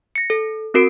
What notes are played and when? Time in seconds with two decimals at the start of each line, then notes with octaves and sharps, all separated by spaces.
0.16 A#6 C#7
0.30 A4
0.74 C4 F#4 A#4 C7 D7